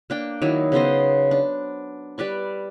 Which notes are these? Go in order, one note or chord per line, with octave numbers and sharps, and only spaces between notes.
A#3 D4 G5
D#3 F#3 D#4 E4
C#3 B3 C5 D#5
D4
G3 B4 D5 C#6